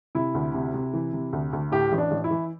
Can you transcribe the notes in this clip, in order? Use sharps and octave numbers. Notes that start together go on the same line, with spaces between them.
C3 E4
D2
C3
C3
E3
C3
D2
D2
A2 G4
A1
D4
A1
E4
E3